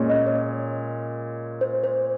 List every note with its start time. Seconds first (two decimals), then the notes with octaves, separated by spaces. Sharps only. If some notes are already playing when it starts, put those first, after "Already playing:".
Already playing: A#2 G#3 C#4
0.09 D#5
0.27 C#5
1.61 C5
1.84 C5